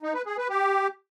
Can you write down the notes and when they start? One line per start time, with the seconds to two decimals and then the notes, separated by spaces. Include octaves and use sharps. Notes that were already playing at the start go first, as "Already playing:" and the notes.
0.03 D#4
0.14 B4
0.26 G#4
0.38 B4
0.49 G4